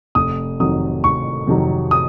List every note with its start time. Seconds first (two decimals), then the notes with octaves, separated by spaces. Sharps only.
0.15 F1 D#6
0.59 F2 C3 D#3 F#3 D#6
1.04 F1 C#6
1.47 F2 C3 D#3 F#3
1.91 D#6